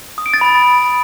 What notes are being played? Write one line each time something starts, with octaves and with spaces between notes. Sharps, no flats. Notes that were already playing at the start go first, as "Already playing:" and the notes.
D#6
D7
A6
B5